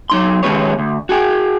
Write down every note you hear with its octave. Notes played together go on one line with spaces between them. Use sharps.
F#3 D#4 C6
D#3 G#3 C#4 G4 B4 C#5
D2
F#4 G#4 G5